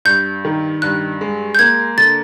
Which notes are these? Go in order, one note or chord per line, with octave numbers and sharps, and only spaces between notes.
G2 G6
D#3
G2 F#6
G#3
G6
A#3 G#6
D3 A6